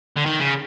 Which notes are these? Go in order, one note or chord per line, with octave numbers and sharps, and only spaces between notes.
D3
D#3
C#3